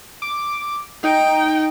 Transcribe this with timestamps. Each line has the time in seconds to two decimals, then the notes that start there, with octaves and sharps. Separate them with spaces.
0.22 D6
1.04 D#4 G5